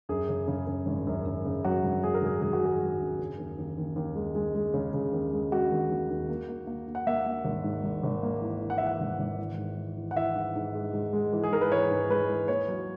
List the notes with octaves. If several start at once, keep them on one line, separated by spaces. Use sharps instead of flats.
F#2 G#4
C#3
C#3
C#3
G#1
F#2
F#2
C#3
F#3 F#4
G#1
F#3 G#4
A#4
G#1 G#4
G#1 G#4
F#4
F#3 G#4
F#3
F#2
C#3
D#2
D#2
D#2
D#2
G#3
G#3
G#3
C#3
C#3
D#2
G#3
G#3 F#4
D#2
D#2
D#2
A#3
A#3
A#3
A#3
F#5
A#3 E5
A#3
G#1
G#2
G#1
G#1
A#3
E3
E3
F#5
E3 E5
F#5
G#1
G#1
E3
G#2
E3
E3
F#5
E3 E5
G#2
G#2
G#3
G#2
G#3
E3
G#4
G#2 A#4
B4
E3 C#5
G#2
G#3 B4
E3
A#3 C#5
F#3